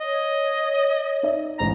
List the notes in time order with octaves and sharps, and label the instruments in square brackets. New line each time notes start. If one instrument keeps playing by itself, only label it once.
[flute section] C#5 [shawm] D#5
[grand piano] D#4 D5 E5
[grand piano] A1 G#2 A#6 [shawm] A#5